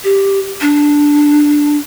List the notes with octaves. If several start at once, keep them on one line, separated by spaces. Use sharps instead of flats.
G4
D4